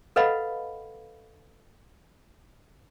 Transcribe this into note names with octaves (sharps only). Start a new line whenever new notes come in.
A4 B4 D#5 F5 F#5 B5